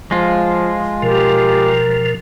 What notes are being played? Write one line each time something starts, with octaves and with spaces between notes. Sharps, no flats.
F3 G#3 F4
B2 F3 G4 A#4